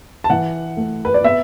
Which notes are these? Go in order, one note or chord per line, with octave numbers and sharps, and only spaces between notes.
A5
E3 F#5
A3
B4
D5
B3 E5